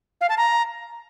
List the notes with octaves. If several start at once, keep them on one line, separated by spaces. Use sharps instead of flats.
F5
A5
A#5